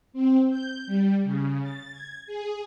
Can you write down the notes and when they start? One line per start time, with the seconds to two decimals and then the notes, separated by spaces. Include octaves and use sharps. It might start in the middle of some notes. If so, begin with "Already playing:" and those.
0.13 C4
0.50 G6
0.87 G3
1.24 C#3
1.62 A6
1.92 G#6
2.27 G#4